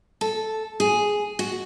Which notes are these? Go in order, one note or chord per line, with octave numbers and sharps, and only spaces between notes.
A4
G#4
F#4